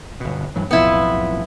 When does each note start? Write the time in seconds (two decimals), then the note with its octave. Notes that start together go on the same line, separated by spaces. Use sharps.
0.20 G1 B2
0.56 G2 E3 F#3
0.71 B1 F2 A2 B3 E4 F4